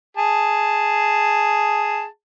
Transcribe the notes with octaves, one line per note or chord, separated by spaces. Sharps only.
G#4 A5